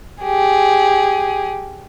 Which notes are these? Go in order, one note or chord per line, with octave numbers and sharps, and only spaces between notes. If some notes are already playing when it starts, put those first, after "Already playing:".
G4 G#4